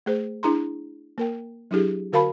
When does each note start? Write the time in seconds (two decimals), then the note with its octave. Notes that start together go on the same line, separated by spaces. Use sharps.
0.06 A3 G#4 C5
0.43 D4 E4 G#4 A#5 C6
1.18 A#3 A#4 G5
1.71 F#3 D4 E4 G4 G#4
2.13 D3 F#4 A#4 F5 A5 B5